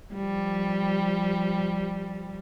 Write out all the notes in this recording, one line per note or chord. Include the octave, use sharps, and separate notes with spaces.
F3 G3